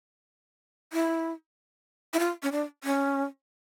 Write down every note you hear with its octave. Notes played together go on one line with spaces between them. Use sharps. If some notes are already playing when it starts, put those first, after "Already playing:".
E4
E4
F4
C#4
D4
C#4